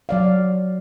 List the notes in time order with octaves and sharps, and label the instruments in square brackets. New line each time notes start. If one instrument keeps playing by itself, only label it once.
[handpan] F#3 D5 F5